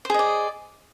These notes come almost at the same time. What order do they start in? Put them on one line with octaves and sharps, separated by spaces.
C5 G#4 D#5 D5